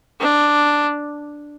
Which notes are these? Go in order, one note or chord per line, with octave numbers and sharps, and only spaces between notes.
D4